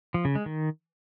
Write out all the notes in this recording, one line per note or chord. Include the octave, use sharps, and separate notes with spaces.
F3
C#3
G#3
D#3